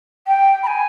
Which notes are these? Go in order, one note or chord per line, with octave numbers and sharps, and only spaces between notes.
G5
B5
G#5